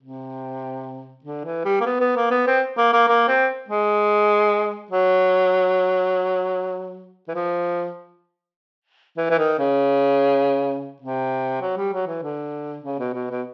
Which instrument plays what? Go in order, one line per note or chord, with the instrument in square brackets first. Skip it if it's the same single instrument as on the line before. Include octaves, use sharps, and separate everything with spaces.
[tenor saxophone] C3
D3
E3
G3
A#3
B3
B3
A#3
B3
C4
A#3
A#3
A#3
C4
G#3
F#3
E3
F3
E3
E3
D#3
C#3
C3
F#3
G3
F#3
E3
D3
C#3
B2
B2
B2